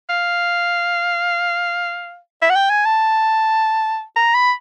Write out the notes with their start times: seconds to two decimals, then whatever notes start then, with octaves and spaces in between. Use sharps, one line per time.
0.09 F5
2.42 E5
2.50 F#5
2.56 G5
2.70 G#5
2.85 A5
4.16 A#5
4.35 B5